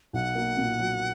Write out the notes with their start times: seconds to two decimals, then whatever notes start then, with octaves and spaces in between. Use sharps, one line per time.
0.13 B1 F#5
0.35 A#3
0.57 A#2
0.79 F#3